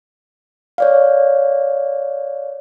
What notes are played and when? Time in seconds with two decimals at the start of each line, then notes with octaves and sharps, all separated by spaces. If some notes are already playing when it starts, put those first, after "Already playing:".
0.78 C#5 D5 F5